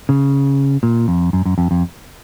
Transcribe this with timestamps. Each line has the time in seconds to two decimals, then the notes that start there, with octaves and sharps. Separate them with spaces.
0.09 C#3
0.83 A#2
1.08 F2
1.33 F#2
1.46 F#2
1.58 F2
1.71 F2